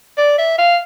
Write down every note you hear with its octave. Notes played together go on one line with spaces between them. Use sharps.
D5
E5
F5